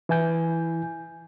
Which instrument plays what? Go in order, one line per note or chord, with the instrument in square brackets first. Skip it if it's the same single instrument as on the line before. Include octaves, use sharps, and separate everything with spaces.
[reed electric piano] E3 E4 G#5 G6